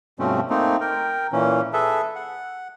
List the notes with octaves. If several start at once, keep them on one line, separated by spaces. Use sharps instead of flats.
G2 B2 F3 A3 C4 C#4
A3 A#3 C4 D#4
A#4 G5
A#2 E3 C#4
G#4 A4 B4 E5
F#5